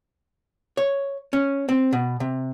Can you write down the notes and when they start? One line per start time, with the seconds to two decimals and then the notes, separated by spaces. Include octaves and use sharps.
0.77 C#5
1.33 C#4
1.69 C4
1.93 B2
2.20 C3